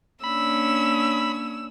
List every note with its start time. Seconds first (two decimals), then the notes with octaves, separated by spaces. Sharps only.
0.24 A#3 C#4 D4 B5 E6